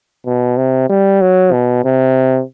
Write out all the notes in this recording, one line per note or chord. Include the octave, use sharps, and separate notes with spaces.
B2
C3
G3
F#3
B2
C3